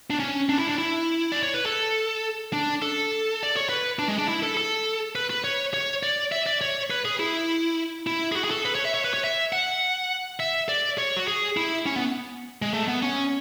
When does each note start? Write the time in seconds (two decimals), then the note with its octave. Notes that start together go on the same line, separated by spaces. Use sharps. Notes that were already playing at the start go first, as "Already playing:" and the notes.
0.10 D4
0.20 C#4
0.49 D4
0.58 E4
0.67 D4
0.78 E4
1.32 D5
1.43 C#5
1.54 B4
1.66 A4
2.53 D4
2.82 A4
3.43 D5
3.57 C#5
3.69 B4
3.99 D4
4.08 G#3
4.18 D4
4.28 E4
4.43 A4
4.57 A4
5.15 B4
5.30 B4
5.44 C#5
5.74 C#5
6.03 D5
6.32 E5
6.47 D5
6.61 C#5
6.90 B4
7.05 G#4
7.20 E4
8.07 E4
8.32 G#4
8.36 F#4
8.44 G#4
8.51 A4
8.65 B4
8.75 C#5
8.85 E5
8.94 C#5
9.04 B4
9.14 C#5
9.24 E5
9.53 F#5
10.40 E5
10.69 D5
10.98 C#5
11.17 F#4
11.28 G#4
11.57 E4
11.86 C#4
11.96 B3
12.62 G#3
12.74 A3
12.88 B3
13.02 C#4